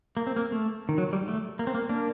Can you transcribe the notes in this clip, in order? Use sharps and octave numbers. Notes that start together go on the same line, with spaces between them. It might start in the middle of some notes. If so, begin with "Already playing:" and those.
A#3
C4
A#3
A3
D#3
F#3
G3
A3
A#3
C4
A#3
A#3 D4